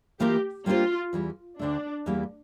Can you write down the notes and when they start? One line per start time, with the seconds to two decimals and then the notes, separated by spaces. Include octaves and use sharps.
0.19 E3 A#3 F4 G4 A#4
0.66 G3 A#3 D4 F4 G4 C5
1.13 E2 E3 G3
1.59 D2 D3 A3 D4
2.06 E2 E3 G3 A#3